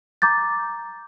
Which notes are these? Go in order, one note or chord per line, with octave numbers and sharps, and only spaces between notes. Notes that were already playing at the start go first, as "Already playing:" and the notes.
A#5 D6 G6 A6